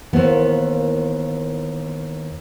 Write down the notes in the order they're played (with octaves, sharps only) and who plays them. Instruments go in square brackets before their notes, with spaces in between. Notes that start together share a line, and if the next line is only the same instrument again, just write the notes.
[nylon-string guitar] D#2 B3 [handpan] E3 A#3 C5